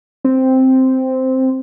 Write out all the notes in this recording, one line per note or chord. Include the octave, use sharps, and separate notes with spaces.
C4